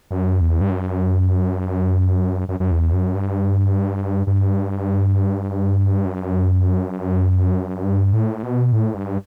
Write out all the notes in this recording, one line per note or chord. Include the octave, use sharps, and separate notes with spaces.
F#2
E2
G2
F#2
F#2
F#2
E2
F#2
G2
G2
F#2
G2
A2
B2
A2
G2